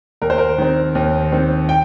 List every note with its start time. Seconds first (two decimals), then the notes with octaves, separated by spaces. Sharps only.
0.22 D#2 A#4
0.30 C5
0.38 A#4
0.58 D#3 C4
0.95 D#2
1.32 D#3 C4
1.69 G5